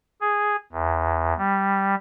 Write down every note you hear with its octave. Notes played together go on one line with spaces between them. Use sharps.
G#4
E2
G3